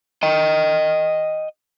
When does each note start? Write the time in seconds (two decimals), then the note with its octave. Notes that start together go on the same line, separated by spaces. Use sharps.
0.23 D#5 G5